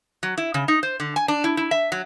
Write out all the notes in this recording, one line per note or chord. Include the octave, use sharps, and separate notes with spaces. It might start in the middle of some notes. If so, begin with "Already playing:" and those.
F#3
E4
C#3
D#4
C5
D3
G#5
D4
E4
E4
E5
F#3